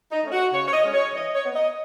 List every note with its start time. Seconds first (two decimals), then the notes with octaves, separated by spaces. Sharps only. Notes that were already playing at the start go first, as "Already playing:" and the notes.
0.12 D#4
0.23 A3 C#4
0.32 F#4
0.53 C#3 C#5
0.68 C#5
0.73 D#5
0.83 G#3 C#4
0.94 C#5
1.14 E3 D#5
1.35 C#5
1.45 B3
1.56 D#5